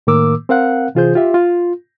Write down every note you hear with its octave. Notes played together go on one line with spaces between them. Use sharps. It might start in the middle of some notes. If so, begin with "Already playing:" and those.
A2 D#3 A#3 A#4 D6 E6
C4 A#4 F5 F#5 F#6
C3 E3 F4 G#4 C5 G6
F4 G4 E5
F4